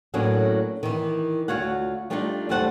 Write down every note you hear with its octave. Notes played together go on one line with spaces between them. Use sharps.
A2 F#3 A#3 B3 C#4 D4
D#3 E3
D2 F4 F#4 C#5 F5 F#5
G3 A3 D4 D#4 F4 A4
D#2 G3 A3 C5 F#5 A5